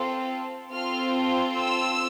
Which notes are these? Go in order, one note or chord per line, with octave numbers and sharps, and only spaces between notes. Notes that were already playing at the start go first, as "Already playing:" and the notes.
Already playing: C4 F4 A4
C4 F4 A4 F6
E6